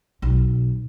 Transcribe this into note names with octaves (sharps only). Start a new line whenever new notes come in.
B1